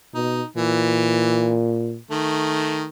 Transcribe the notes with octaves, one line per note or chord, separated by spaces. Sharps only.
B2 D#4
A#2 E3
D#3 A3